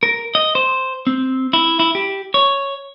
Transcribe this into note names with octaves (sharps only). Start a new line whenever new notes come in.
A#4
D#5
C5
C4
E4
E4
G4
C#5